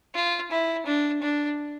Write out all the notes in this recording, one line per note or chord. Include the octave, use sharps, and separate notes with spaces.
F4
E4
D4
D4